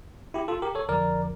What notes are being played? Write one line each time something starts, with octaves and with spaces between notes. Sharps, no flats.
E4 G4
F4 A4
G4 A#4
A4 C#5
F2 D3 F3 A#4 D5